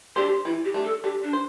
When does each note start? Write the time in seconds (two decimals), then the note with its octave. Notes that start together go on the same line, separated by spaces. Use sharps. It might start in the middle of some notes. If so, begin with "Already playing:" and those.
0.16 D4 G4 A4 C5
0.45 E3 E4
0.65 G4
0.74 A3 D4
0.84 A4
1.04 D4 G4
1.23 D4
1.33 C5